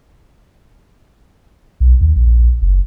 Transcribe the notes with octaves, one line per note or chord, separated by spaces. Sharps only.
B1
D#2
A#1
F#1